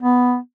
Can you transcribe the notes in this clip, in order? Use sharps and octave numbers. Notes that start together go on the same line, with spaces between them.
B3